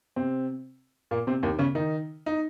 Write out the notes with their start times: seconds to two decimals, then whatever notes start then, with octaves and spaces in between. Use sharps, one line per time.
0.16 C3 C4
1.11 A#2 A#3
1.27 C3 C4
1.43 D#2 D#3
1.59 C#3 C#4
1.75 D#3 D#4
2.26 D#4